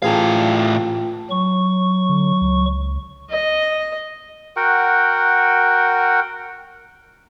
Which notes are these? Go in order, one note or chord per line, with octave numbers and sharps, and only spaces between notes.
A1 A2 F4 G#4 F5 G5 A5 A#5
F#3 C#6
D3
C#2
D#5
F#4 A#4 F#5 G5